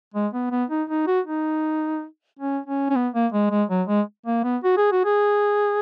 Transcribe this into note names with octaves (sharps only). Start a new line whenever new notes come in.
G#3
B3
B3
D#4
D#4
F#4
D#4
C#4
C#4
C#4
B3
A#3
G#3
G#3
F#3
G#3
A#3
B3
F#4
G#4
F#4
G#4